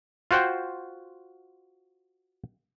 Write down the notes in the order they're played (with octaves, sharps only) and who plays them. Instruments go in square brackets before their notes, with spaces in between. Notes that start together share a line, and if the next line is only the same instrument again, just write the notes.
[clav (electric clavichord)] F4 F#4 C5 F#5 G5